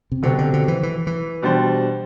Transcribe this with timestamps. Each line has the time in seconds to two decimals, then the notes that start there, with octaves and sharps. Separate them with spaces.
0.12 C3
0.23 B2 D3 F#3 C4 G4
0.38 D3
0.53 D3
0.68 E3
0.83 E3
1.07 E3
1.42 B2 G3 D4 G4 C5